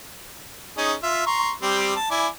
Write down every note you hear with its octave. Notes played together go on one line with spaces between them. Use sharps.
C#4 D#4 G#4
F4 E5
A#5 C6 C#6
G3 C4 G4
A5
E4 D5 G#5